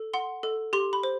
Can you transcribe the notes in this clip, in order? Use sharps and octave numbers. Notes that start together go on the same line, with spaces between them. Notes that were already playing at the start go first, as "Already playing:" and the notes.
Already playing: A4
F#5 C6
A4
G4 C6
B5
C5